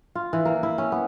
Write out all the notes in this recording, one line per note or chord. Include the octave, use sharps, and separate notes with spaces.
F4
E3
A#3
E4
C#4
B3